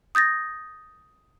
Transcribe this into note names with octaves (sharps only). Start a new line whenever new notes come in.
D#6 G6 A6 A#6